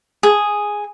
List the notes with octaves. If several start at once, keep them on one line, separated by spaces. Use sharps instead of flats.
G#4